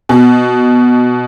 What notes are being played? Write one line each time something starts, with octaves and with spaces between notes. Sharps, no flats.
B2